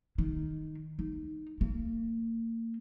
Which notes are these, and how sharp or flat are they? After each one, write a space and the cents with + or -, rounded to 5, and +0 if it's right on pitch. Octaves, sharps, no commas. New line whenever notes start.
D#3 +0
D#4 -10
A#3 -35